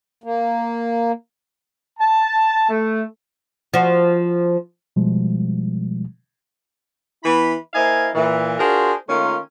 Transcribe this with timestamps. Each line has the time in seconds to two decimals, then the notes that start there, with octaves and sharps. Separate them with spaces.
0.24 A#3
1.99 A5
2.69 A3
3.74 F3 F#4
4.96 B2 F3 G3 G#3
7.23 E3 B3 E4 B5
7.74 A#3 E4 C5 D#5 F5 G#5
8.15 A#2 E3
8.60 D4 F4 F#4 G#4 A#4 C5
9.09 D#3 A3 A#3 C#4 F4